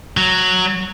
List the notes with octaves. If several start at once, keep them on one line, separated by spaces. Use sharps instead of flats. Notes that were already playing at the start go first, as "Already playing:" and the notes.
F#3